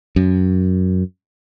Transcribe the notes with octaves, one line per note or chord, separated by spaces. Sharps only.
F#2